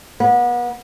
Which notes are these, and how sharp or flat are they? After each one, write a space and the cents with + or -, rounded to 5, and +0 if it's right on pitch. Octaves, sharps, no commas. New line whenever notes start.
B3 -35